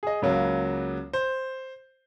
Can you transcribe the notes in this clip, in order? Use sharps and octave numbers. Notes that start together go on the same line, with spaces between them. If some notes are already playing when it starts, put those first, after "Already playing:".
G#4 D#5
C#2 C#3 F#3 A#3
C5